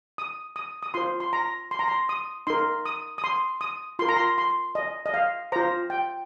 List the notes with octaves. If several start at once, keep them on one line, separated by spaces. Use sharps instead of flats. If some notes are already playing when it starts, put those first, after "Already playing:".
D#6
D#6
D#6
F4 C5 C6
C6
A#5
C6
A#5
C6
D#6
D#4 A#4 C6
D#6
D#6
C6
D#6
F4 A#4 C6
A#5
C6
C6
D#5
D#5
F5
F4 C5 A#5
G5